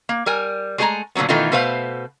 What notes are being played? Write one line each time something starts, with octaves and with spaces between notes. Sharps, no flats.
A#3
G3 A#4 G#5
G#3 A3 G#4 A4 G#5 A#5
A#2 D3 E3 F#3 B3
B2 D#3 E3 A3 D#4 F4
B2 A3 B4 C5 F5